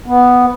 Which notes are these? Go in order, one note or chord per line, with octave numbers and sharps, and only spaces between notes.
B3